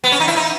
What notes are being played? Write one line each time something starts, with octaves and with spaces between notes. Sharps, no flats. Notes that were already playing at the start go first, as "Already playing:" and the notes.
B3
C#4
D#4
E4
D#4